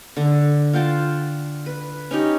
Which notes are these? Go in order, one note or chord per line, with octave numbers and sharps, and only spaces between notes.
D3
F4 F#5 G5 A5
B4
C#4 D#4 G4